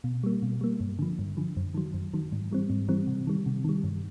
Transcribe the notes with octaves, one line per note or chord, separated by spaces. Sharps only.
B2
G3 A#3
B2
G3 A#3
G2
D3 F3
G2
D3 F3
F#2
D#3 F#3
F#2
D#3 F#3
G#2
E3 G3 C4
G#2
E3 G3 C4
C3
D#3 G3
C3
D#3 G3
G2